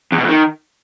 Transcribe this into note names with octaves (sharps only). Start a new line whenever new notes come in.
E2
B2
F2
D#3